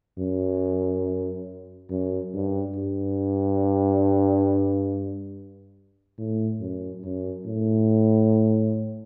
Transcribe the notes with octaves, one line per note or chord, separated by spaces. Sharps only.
F#2
F#2
G2
G2
A2
F#2
F#2
A2